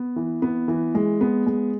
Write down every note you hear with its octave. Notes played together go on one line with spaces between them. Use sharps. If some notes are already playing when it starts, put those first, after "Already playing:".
Already playing: B3
E3
B3
E3
G#3
B3
G#3